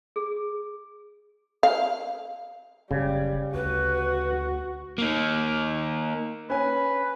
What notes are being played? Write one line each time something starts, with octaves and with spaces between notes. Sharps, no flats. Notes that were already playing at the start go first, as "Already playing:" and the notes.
G#4
F5
F#1 C#3 G3
D2 F#4 B4
A#3 D#4
C#4 B4 G#5